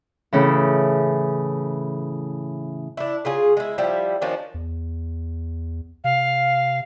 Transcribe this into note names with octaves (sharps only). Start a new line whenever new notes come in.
A2 C#3 E3
D4 E4
C#3 F4 G#4
G#3 E4
F3 G3 E4 G4
D#3 F3 C#4 D4
E2
C3 F5